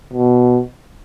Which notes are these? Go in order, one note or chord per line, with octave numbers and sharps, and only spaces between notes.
B2